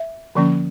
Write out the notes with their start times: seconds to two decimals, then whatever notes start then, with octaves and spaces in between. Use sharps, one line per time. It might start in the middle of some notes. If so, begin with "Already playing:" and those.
Already playing: E5
0.35 D3 F3 A#3 C#4